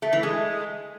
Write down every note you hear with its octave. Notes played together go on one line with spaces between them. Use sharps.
A3
E3
G#3